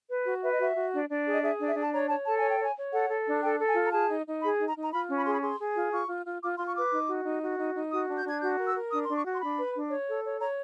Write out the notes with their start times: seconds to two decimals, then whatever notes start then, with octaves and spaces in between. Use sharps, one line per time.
0.10 B4
0.26 F#4
0.42 B4 E5
0.52 D#5
0.59 F#4 E5
0.76 F#4
0.92 D4
1.09 D4
1.25 G#4
1.33 D#5
1.43 G#4 E5
1.59 D4
1.67 E5
1.76 D4
1.81 A5
1.92 C#5 A#5
2.09 C#5 A5
2.25 A4 A5
2.38 C#5 G#5
2.50 G5
2.59 C#5 G#5
2.75 C#5
2.92 A4 F#5
3.09 A4
3.26 D4
3.42 A4 G5
3.59 A4
3.67 G#5
3.75 F4
3.86 A#5
3.92 G#4 A5
4.09 D#4
4.26 D#4
4.41 G#4 B5
4.59 D#4
4.66 A#5
4.75 D#4
4.82 A#5
4.92 F4 B5
5.09 C#4
5.17 B5
5.25 G#4 C6
5.32 B5
5.42 G#4 C6
5.59 G#4
5.75 F4
5.91 F4 C#6
6.09 F4
6.25 F4
6.41 F4 D6
6.58 F4 C6
6.68 C#6
6.75 B4 D6
6.92 D#4
7.08 F#4
7.25 D#4
7.42 F#4
7.58 D#4
7.74 D#4
7.91 F#4 D#6
8.08 D4
8.17 G6
8.25 D4 G#6
8.41 F#4 G6
8.58 A#4
8.66 E6
8.75 A#4
8.91 D4 D#6
9.05 D4 C6
9.17 C#6
9.25 F#4
9.34 C6
9.41 D4 B5
9.57 B4
9.74 D4
9.91 C#5
10.08 A4
10.25 C#5
10.41 C#5 A#5